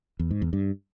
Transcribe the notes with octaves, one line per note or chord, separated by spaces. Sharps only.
E2
G#2
E2
G2